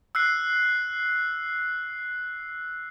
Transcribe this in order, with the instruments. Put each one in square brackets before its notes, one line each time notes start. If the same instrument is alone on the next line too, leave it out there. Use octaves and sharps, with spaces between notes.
[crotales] E6 F#6 C7